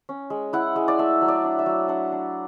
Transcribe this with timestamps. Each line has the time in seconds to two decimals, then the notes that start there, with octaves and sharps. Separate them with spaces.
0.09 C#4
0.30 G#3
0.53 E4 F#5
0.76 G#3
0.88 D5
0.99 A3 E5
1.22 F#3
1.28 D5
1.44 D4
1.59 E5
1.66 F#3
1.88 D4 F#5
2.12 D4